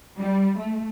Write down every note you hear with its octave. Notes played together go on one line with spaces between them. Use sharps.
G3
A3